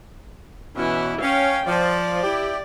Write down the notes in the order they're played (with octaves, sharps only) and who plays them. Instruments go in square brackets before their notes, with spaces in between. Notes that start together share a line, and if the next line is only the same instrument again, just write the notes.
[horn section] B2 C#4 [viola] E3 E4
[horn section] C#4 [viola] F5 G5
[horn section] F3 [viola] D5
[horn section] E4 G4